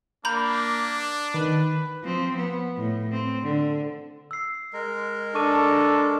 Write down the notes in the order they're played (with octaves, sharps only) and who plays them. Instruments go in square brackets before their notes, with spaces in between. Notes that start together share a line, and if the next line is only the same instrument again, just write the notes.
[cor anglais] A#3 [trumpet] D4 [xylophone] A#5 B5 G6
[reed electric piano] D#3 [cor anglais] B4
[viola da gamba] F3 C4
B3
A2
C4
D3
[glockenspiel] E6 C7
[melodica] G#3 A#4
[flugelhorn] D4 [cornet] A4 [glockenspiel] C#6 D6 D#7